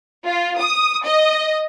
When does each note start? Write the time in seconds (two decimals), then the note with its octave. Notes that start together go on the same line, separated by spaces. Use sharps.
0.26 F4
0.61 D#6
1.05 D#5